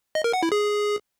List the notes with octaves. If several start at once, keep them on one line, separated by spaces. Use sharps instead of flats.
D#5
A#4
F#5
E4
G#4